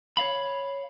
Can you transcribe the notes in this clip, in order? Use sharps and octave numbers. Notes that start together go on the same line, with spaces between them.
C#5 D5 F5 B5